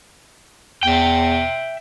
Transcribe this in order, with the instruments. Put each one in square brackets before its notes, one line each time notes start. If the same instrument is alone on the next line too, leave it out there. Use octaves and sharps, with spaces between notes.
[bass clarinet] E2 [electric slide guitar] E5 G5